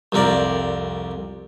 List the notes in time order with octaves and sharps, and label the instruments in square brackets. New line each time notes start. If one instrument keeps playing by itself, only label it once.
[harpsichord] C2 F2 C4 A#4 D5